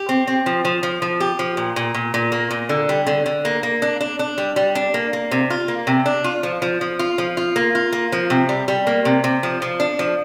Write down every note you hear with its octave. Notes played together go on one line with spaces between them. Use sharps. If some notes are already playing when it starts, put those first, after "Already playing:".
Already playing: G4
C4
C4
F3
F3
F3
F3
G4
F3
A#2
A#2
A#2
A#2
A#3
A#2
D3
G3
D3
D3
A#3
A#3
D4
D4
D4
G3
G3
D4
A#3
A#3
C3
F4
A#3
C3
D4
F4
F3
F3
F3
F4
F3
F4
A#3
F4
A#3
F3
C3
G3
G3
A#3
C3
C3
F3
F3
D4
F3